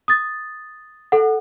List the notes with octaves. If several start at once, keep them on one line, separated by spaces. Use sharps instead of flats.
D#6 A6
A4 F#5